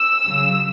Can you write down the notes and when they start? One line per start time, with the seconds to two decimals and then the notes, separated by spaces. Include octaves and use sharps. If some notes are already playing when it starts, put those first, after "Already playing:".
Already playing: E6
0.26 C#3 F#3